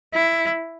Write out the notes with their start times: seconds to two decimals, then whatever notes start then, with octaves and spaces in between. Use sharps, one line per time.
0.14 E4